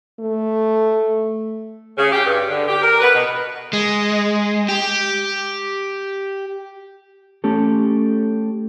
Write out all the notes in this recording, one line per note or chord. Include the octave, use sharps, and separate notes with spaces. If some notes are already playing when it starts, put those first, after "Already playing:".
A3
C#3
G4
G2
D3
G4
A#4
B4
B2
G#3
G4
A3 C#4 G4 A4